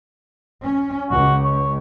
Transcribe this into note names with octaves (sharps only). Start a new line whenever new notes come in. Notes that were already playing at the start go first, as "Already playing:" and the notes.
C#4
C#2 F#4
C#5